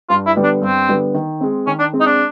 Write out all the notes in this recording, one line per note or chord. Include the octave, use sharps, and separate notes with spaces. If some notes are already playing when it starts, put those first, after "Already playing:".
G2 F4
E4
D3 G3 B3
D4
G2 C4
D3 G3 B3
D#3
G#3 C4
D#3 C#4
D4
G#3 C4
D#4
D4